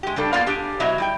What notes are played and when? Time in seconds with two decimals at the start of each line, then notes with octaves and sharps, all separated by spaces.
0.03 G#3 G4
0.16 C#3 G3 D4 A4
0.33 A#3 B3 F4 D5 F5
0.46 D4 G4 G#4
0.80 B2 F#3 E4 D#5 E5 A#5
0.98 G3 E4 G5